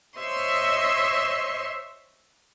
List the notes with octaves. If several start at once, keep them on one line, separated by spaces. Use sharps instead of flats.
C5 C#5 D#5 E5 C6 C#6